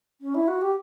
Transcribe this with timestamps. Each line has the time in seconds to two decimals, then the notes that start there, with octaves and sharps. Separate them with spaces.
0.21 C#4
0.35 E4
0.48 F#4
0.61 G4